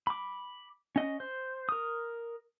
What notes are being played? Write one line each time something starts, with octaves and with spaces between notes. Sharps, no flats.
B5 D6
C#4 D#5
C5
A#4 D#6